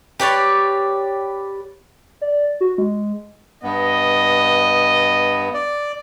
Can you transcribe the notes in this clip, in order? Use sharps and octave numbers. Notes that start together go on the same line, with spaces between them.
G4 B4 C#5 D5
D5
F#4
G#3
G2 B3 D#5
D5